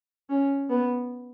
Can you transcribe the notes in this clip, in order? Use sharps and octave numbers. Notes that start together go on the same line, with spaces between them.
C#4
B3